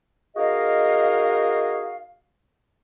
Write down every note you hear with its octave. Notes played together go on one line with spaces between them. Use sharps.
D#4 F#4 G#4 A#4 D#5 F5